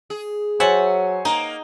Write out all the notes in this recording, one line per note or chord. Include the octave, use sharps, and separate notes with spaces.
G#4
F#3 C5 C#5 E5 F#5 G#5 A5
A#3 D#4